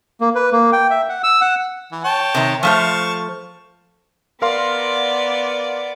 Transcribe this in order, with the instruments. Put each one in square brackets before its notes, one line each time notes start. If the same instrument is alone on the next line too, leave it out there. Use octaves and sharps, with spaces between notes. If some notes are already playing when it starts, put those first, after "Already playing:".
[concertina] A#3
B4
A#3
G5
E5
F#5
E6
F#5
[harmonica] E3
C#5 G5 A5
[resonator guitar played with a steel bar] C3 D#3 A#5
[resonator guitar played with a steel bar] F3 A3 C5 [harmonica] F5 A5 C#6
[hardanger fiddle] B3 D5 [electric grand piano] A#4 F5 C6